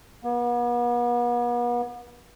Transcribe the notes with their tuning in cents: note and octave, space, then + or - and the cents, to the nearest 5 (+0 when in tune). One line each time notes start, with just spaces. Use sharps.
B3 -40